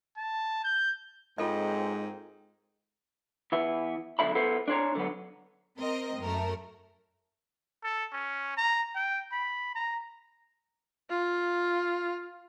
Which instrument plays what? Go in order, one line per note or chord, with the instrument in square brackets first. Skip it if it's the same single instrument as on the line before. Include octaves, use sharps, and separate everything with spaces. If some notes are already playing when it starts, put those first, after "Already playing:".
[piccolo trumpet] A5
G6
[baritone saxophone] G#2 [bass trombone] G#3 [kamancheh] A#3 C4 [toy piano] F4 A4 D#5
[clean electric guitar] E3 B3 E5
B1 B2 D3 E5 B5
B3 E4 A4 C5
D4 C5 C#5 A#5
D3 F#3 B3
[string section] C4 A#4 D#5
F#2 A3 A#4
[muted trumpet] A4
C#4
A#5
G5
B5
A#5
[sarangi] F4